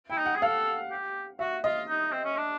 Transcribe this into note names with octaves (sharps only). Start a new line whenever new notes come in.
E4 G5
D#4
F#5
G#4
A4 F5
G4
F#4 E5
F4 D#5
D#4
C4
C#4
D4